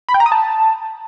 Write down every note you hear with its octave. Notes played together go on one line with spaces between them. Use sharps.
B5
G5
A#5
D#6
A5